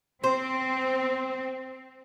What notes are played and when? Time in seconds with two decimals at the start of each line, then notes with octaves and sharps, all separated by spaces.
0.24 C4 C5